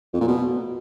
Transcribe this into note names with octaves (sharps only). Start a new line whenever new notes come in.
F2
A#2
B2